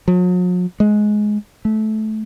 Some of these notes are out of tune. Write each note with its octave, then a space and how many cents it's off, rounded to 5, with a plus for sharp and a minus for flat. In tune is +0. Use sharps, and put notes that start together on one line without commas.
F#3 -45
G#3 +15
A3 -20